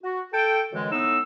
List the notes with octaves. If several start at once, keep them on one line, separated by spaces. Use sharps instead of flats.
F#4
A4 G5
F#2 D3 E3 G#3
A2 B3 D#4 E6